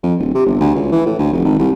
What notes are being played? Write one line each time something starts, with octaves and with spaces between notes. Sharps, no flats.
F2
D1
C3
G1
D2
C#2
E3
A2
D2
F1
G#1
C2